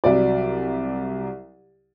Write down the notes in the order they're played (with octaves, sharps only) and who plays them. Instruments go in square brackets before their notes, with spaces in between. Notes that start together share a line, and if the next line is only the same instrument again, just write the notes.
[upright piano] C2 F#3 D5